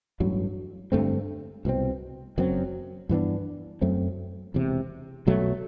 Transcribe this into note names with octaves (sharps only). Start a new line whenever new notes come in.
A1 G2 F#3
G2 D3 A3 C4
C2 B2 F#3 C4
F#1 F#2 F#3 C4
G2 E3 B3 D4
F#2 F#3 A3 C4
E1 E2 C3
B1 B2 F#3 A3